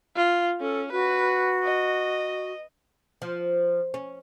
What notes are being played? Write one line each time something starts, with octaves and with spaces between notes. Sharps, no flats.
F4
C#4 A4
F#4 B4
D#5
F3
C#4